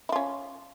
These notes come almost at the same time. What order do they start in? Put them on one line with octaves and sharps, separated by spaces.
E4 F4 C#4